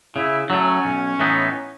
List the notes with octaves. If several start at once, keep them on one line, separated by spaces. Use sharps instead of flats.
C#3 E4
F#3 A3 C#4
B1
A2 E3 B3 D#4